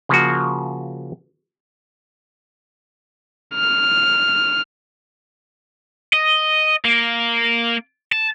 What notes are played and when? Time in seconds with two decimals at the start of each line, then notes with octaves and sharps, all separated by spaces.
0.09 C#3 F3 A#3 F#4
3.55 F6
6.13 D#5
6.85 A#3
8.12 A5